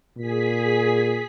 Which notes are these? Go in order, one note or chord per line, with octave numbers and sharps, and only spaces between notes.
A#2 G#4 B6